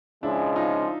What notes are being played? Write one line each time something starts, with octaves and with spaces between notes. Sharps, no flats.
C#3 F3 G#3 D4 E4
D#4 F4